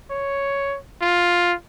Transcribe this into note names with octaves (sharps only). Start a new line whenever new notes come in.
C#5
F4